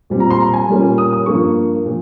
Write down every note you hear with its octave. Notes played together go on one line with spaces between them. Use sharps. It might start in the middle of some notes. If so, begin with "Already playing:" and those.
A#2 G3 C4
A#5
C6
A#5
G#5
A#2 G3 A#3 C#4
D#6
D#6
G2 F3 A#3 C#6
A#2 F3